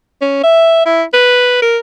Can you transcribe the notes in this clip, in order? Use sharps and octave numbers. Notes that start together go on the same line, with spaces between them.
C#4
E5
E4
B4
A#4